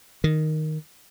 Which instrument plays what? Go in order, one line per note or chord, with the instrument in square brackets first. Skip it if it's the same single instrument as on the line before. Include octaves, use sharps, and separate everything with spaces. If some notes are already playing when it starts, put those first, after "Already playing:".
[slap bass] D#3